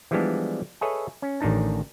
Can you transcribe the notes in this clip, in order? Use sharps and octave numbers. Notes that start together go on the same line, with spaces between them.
E3 F3 G3 G#3 B3 D4
G#4 A4 B4 C#5 D#5 E5
C#4
A1 D#3 D4 D#4 A5